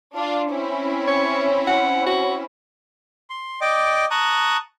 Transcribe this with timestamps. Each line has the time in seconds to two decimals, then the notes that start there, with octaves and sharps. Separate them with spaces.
0.16 D4 F4
0.50 C4 C#4 E4
1.08 C#5
1.67 F#5
2.07 F#4
3.30 C6
3.61 D5 D#5 G5 D6
4.11 A5 A#5 C#6 D#6 F#6